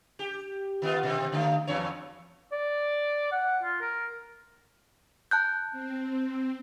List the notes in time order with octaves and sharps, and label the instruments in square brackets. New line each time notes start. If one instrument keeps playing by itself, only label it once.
[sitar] G4
D#3 B3 F4
B2 D#3 C4
D3 A3 D#4
E2 G2 C#5
[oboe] D5
F#5
F4
A#4
[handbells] A5 F#6 G6
[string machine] C4